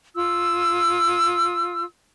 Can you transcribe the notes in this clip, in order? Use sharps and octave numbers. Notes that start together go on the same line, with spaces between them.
F4 E6